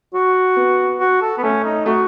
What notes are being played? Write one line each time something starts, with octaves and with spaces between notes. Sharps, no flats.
F#4
B3
F#4
A4
B3
A3 C#4
D#4
A3 F#4